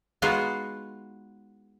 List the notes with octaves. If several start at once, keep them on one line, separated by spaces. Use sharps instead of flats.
G#3 B3 D#4 F4 F#4 G#4